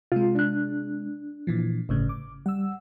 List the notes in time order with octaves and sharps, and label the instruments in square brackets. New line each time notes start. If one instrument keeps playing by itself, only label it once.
[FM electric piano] C3 G#3 [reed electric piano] F4
[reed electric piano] D4 F#6
[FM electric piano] A#2 E3 F3
G1 A2 C#3
D6
[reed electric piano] G3 [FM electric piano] F#5 E6